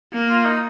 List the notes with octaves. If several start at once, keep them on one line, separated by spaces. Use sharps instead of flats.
A#3
F4
D#4